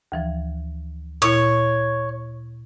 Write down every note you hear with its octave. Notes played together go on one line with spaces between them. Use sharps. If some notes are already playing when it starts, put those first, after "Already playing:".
D2 E3 F3
A#2 E4 C#5